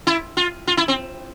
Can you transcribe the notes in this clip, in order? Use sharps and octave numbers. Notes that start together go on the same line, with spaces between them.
E4
F4
F4
E4
C4